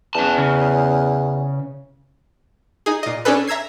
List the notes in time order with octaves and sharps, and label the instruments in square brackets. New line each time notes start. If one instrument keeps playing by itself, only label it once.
[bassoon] E2 [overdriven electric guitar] C#4 A5
[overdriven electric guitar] C#3
[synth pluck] D#4 G#4
A#2 D#5
C#4 D4 G#4 A4 B4
E5 A#5 E6 G#6 C7